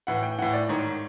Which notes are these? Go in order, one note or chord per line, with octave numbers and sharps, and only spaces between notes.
A2 E3 F#5
G5
A2 E3 F#5
D5
G#2 D#3 C#5